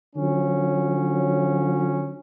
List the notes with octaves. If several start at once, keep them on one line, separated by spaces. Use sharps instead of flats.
D3 F3 F#3 C#4